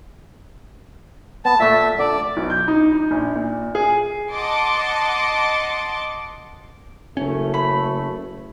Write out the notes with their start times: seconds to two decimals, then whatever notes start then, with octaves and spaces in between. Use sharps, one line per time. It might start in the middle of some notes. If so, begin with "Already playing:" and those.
1.45 B3 A5
1.60 A#2 A3 E5
1.99 D3 D4 D5
2.37 B1
2.50 G6
2.68 D#4
2.92 D#4
3.11 A#1
3.35 A#2
3.75 G#4
4.32 D#5 F#5 A5 C6 D6
7.17 F#1 C#3 A3 C#4
7.54 B5